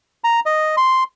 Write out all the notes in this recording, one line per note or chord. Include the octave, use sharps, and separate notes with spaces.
A#5
D#5
C6